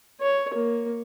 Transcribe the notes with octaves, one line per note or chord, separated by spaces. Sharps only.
C#5
A#3